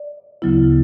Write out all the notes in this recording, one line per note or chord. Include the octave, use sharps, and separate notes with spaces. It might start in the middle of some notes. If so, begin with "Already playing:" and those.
Already playing: D5
D2 C#3 F#3 B3 E4